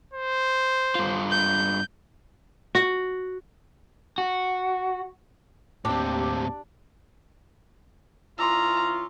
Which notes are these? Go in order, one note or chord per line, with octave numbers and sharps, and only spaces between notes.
C5
G2 F4
G6
F#4
F#4
D#2 A2 C4 D4 G4
E3 C#4 F4 A#5 C6 D6 E6